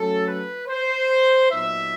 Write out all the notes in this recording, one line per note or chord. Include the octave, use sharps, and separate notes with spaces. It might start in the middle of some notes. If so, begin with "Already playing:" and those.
Already playing: F#3 A3 C#4 A4
B4
C5
A#2 F#3 B3 D#4 E5